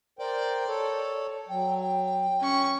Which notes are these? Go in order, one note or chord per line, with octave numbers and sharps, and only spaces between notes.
A#4 C5 D5 G5
A4 C#5
F#3 G5
G5
C#4 C#6